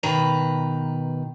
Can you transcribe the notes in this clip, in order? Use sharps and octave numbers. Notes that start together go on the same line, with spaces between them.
B2 D#3 B4 A#5